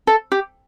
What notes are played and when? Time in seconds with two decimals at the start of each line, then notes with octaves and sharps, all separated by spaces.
0.07 A4
0.32 G4